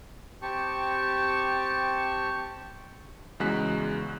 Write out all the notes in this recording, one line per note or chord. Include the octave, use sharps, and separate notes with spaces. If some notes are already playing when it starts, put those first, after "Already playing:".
C4 G4 A5 C#6
E2 C#3 G#3 F#4 F#6 B6